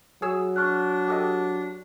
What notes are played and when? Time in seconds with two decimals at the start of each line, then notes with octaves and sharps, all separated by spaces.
0.22 F#3 G#4 C#5 E6
0.56 D4 C#6 F6 F#6
1.08 G4 A4 D#5